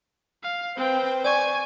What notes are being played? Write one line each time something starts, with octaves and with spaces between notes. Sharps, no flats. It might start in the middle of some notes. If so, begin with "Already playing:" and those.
F5
C4 B4 C5 G5
D5 G#5 C#6